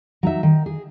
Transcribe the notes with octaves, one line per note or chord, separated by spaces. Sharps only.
F#3 D#4 E5
D#3
G#4